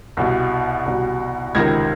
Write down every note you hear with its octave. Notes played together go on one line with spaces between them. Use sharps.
C2 B2
C2 B2
C#2 C3 D#3 G#6 A#6